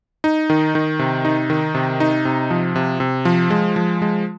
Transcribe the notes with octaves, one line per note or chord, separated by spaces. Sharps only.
D#4
D#3
D#3
C3
D#4
D#3
C3
D#4
C3
F3
C3
C3
F3
G#3
F3
G#3